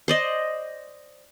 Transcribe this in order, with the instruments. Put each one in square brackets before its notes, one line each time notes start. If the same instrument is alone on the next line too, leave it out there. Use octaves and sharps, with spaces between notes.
[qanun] C5 D5 D#5